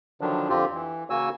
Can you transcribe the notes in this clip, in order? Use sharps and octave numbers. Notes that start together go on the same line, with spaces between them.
D3 D#3 F3 F#3 D4
F2 D3 C4 F4 G4
E3
C#3 A#3 F#4 G#5 E6